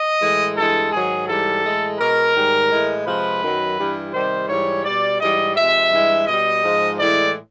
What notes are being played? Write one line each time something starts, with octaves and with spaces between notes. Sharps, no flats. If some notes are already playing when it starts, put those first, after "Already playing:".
Already playing: D#5
A2 E3 G#3
G2 E3 G#3 A4
G#2 D#3 F#3 G#4
G#2 E3 G3 A4
A2 E3 G#3
B2 G#3 A#4
G#2 D#3 G3
A2 E3 G#3
C3 F3 G#3 B4
F#2 D#3 F#3
G2 E3 G3
C3 D#3 G3 C5
G#2 E3 G3 C#5
B2 G3 D5
G#2 E3 G3 D#5
C3 F3 G#3 E5
G2 E3 G#3
B2 G3 D#5
G#2 F3 G#3
A2 E3 G#3 D5